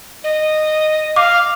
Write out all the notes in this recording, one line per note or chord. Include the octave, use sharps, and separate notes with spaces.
D#5
F5 D6